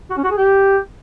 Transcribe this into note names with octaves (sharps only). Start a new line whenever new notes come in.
F#4
C#4
F#4
G#4
G4